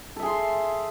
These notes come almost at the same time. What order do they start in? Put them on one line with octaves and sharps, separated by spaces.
A4 E5 G#4 C6